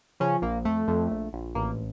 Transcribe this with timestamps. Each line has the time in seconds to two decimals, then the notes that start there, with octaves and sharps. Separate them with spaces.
0.20 C#3 F3 C#4
0.42 A#1 A#3
0.65 F2 A3
0.88 F2
1.11 A#1
1.33 A#1
1.55 A1 A#3